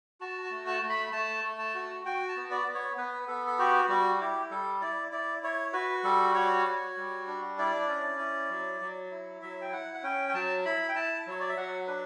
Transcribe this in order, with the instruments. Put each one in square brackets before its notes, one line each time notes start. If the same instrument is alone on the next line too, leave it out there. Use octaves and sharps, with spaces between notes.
[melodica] F#4 A5
A5
A3
A5
A3
B5
A3 A5
A3
A5
F#4
F#4 G5
A5
B3
D5
B3
C#5
B3 B4
B3 A4
A4
F#4 G4
G3 F#4
E4 G4
G3 A4
E4 D5
E4 D5
E4 C#5
F#4 B4
G3 A4
F#4 C#5
F#4
G3
D4
E4 D5
C#4
E4
F#3
F#3
E4
F#3 E5
G5
E4 F#5
F#5
C#4 G5
G5
F#3 A5
E4 B5
G5
E4 A5
F#3 C#5
D5
E5
F#3 F#5
D4 B4